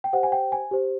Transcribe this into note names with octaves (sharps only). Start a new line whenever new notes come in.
G5
G4 C5 F#5
G#5
G5
G#5
G4 C5